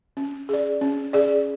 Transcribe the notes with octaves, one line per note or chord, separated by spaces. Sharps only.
C#4
G#4 D5
C#4
G#4 D5